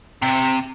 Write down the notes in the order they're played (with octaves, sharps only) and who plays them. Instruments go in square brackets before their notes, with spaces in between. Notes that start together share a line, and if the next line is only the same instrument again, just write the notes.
[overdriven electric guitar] C3